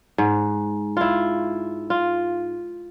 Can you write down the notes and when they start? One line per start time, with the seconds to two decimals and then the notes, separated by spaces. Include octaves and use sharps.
0.18 G#2
0.97 E4 F4
1.90 F4